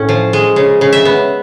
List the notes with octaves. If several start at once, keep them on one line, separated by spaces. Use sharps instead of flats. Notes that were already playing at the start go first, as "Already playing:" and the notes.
Already playing: A2 C#4
F3
G#3
C#3
C#3
E5
B3